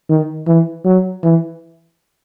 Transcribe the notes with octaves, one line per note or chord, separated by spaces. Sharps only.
D#3
E3
F#3
E3